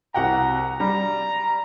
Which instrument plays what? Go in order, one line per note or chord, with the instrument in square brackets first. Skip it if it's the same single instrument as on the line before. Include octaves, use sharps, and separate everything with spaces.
[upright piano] C2 F#5 G5 [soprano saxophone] A#5
[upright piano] G3 [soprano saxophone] A#5